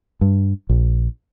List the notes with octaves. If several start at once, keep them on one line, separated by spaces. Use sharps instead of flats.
G2
A#1